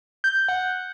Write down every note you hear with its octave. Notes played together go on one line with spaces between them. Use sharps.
G6
F#5